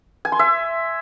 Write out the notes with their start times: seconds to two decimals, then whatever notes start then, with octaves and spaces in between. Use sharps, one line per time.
0.25 G#5
0.32 C6
0.39 E5